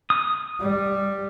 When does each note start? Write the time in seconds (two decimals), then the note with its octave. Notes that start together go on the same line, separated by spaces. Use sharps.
0.10 D#6
0.60 G3